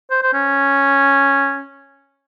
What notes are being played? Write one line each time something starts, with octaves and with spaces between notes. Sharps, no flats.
C5
C5
C#4